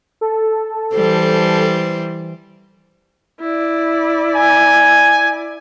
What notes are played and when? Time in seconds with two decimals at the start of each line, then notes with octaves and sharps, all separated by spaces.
0.21 A4
0.95 E3 G3 C5
3.41 E4 D5
4.36 G#5